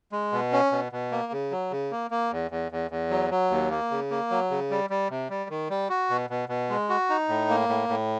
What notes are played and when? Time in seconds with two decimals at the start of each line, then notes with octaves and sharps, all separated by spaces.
0.12 G#3
0.32 B2
0.52 C#4
0.72 B2
0.92 B2
1.12 A#3
1.32 C#3
1.51 F#3
1.71 C#3
1.92 A#3
2.11 A#3
2.32 E2
2.51 E2
2.72 E2
2.91 E2
3.10 F#3
3.31 F#3
3.50 D#2
3.71 A#3
3.91 C#3
4.10 A#3
4.30 F#3
4.50 C#3
4.70 G3
4.90 G3
5.10 C3
5.30 G3
5.50 D#3
5.70 G3
5.89 F#4
6.10 B2
6.30 B2
6.49 B2
6.69 G#3
6.89 F#4
7.09 D#4
7.29 A2
7.49 A#3
7.69 A2
7.89 A2